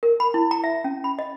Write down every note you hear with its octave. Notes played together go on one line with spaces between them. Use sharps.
A#4
B5
E4
A#5
E5
C#4
B5
D#5